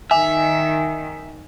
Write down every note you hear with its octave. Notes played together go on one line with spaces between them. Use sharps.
D#3 E5 G#5